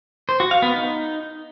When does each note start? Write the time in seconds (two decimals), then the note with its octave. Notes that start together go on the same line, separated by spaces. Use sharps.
0.29 C5
0.40 F#4
0.51 F5
0.62 B3
0.74 D#4